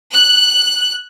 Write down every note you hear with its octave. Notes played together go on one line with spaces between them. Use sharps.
F#6